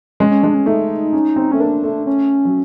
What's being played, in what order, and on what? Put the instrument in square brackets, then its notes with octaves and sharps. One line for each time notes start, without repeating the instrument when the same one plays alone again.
[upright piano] G#3 [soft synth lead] C#4
[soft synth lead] C#4
[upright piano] G#3 [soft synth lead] D4
[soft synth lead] C#4
[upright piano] A3 [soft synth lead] D#4
[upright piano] C#4
C4
[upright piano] A3 [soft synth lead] C#4
[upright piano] A#3 [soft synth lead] D4
[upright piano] A3
[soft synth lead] C#4
[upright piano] F#3